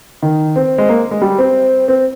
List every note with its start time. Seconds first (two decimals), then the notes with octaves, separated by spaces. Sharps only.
0.23 D#3
0.56 C4
0.78 G#3
0.89 A#3
1.11 G#3
1.22 G3
1.38 C4
1.88 C4